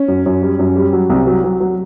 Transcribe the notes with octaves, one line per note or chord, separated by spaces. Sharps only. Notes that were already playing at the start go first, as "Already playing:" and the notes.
Already playing: C#4
F#2
F#2
G3
F#2
G3
F#3
C2
F#3
F#3
F#3